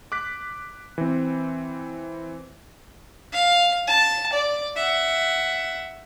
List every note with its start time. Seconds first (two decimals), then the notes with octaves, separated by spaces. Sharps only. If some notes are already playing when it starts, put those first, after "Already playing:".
0.12 D6 F#6 B6
0.98 E3 C4
3.33 F5
3.87 A5
4.33 D5
4.77 E5 F#5